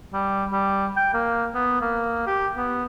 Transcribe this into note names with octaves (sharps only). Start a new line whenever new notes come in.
G3
G3
G5
A#3
B3
A#3
G4
B3